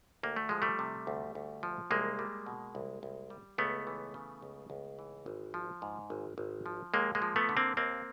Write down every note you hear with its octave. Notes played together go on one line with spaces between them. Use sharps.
D2 A#3
A3
F3 G#3
G3 A3
C3
D2
D2
F3
C2 G#3 A#3
G3
B2
C2
C2
G3
C#2 A3 B3
E3
C#3
C#2
C#2
E3
G#1
F3
G#2
G#1
G#1
F3
D#2 G#3 A#3
G#3 A#3
F3
A3 B3
D3
A#3 C4
D#2 A#3 C4